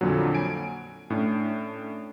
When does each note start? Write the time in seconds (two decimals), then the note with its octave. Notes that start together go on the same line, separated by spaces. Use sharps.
0.01 F2 A#2 D3 F#3
0.35 G#5 D7
1.10 A2 C#4 D4